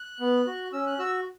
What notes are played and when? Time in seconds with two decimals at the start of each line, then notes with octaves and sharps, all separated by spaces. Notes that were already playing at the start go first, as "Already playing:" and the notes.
Already playing: F#6
0.20 B3
0.47 F#4
0.73 C#4 E6
0.86 F#6
0.99 F#4 E6